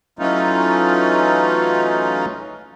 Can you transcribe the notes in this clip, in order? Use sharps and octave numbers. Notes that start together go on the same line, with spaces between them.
E3 F#3 A3 C#4 D#4 F4